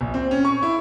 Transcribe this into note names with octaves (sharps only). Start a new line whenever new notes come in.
A#1
C4
C#4
C#6
E4